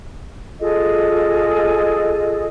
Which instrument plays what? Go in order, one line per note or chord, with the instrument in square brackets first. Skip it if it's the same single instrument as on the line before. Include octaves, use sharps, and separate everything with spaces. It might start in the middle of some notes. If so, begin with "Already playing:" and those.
[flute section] F4 G#4 A4 D#5